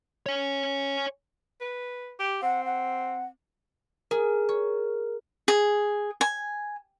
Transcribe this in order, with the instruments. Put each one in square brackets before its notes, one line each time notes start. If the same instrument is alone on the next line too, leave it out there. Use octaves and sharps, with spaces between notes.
[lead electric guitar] C#5 G#5
[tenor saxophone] B4
G4
[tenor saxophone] C4 [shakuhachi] F#5
[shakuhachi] F#5
[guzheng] G#4 [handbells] A#4
[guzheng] C#5
[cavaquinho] G#4
G#5